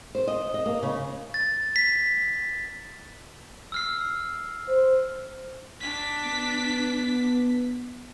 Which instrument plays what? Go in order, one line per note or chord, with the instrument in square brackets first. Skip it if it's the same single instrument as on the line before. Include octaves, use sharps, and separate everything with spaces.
[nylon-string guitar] C5
D#5
D#5
A#3
C#3
[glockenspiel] A6
B6
E6 F6 C7
[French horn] C5
[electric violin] D4 B6
[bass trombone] B3